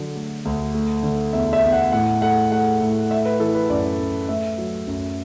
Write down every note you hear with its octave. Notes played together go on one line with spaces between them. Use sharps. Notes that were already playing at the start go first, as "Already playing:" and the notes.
Already playing: D3 F#3
A3
D2
A3
D3
E2 E5
E5
E2
F#5
A2 F#5
A3 F#5
A3 F#5
A2
A3 E5
B4
E3 A4
B4
F#2 D5
F#2
A3 E5
F#3
F#2